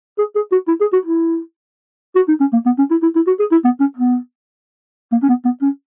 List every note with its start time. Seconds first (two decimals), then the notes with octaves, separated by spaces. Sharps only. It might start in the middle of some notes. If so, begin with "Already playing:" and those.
0.19 G#4
0.36 G#4
0.52 F#4
0.68 E4
0.81 G#4
0.93 F#4
1.05 E4
2.16 F#4
2.28 D#4
2.40 C#4
2.53 A#3
2.66 B3
2.78 C#4
2.91 E4
3.02 E4
3.15 E4
3.27 F#4
3.40 G#4
3.51 E4
3.65 B3
3.80 C#4
3.97 B3
5.12 A#3
5.22 C#4
5.29 B3
5.45 B3
5.62 C#4